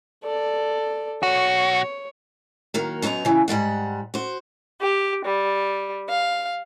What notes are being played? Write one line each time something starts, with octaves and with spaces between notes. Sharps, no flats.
A4 D5
B1 F#4 C#5
D#3 F#3 A#3
F#2 F#3 B3 D#4 A#5
C#3 E3
G#2 E3 G3 F#5
F#4 C5
G4
G3
F5